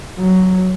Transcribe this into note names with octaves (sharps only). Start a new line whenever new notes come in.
F#3